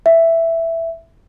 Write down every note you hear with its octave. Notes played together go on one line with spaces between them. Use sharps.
E5